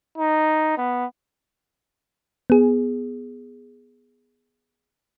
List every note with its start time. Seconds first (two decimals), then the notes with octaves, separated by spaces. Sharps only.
0.18 D#4
0.77 B3
2.50 B3 G#4